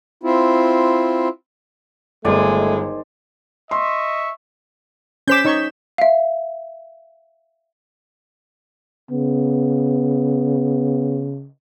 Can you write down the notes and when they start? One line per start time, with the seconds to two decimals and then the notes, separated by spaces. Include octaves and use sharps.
0.23 C4 E4 F4
2.25 G1 D#3 G#3 A3 C5 D5
3.71 D#5 E5 C6 C#6
5.28 C#4 C5 D6 G6 B6 E7
5.45 D#4 C#5 C#6
5.98 E5 F5
9.11 C#3 B3